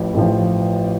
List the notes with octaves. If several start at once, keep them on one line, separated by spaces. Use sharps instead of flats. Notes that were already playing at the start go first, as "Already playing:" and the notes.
Already playing: A1 A2 F3
A1 A2 F3